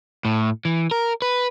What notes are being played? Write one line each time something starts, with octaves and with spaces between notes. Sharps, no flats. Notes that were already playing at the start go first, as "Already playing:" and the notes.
A2
E3
A#4
B4